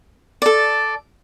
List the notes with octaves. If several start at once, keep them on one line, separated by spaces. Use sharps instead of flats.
A4 D5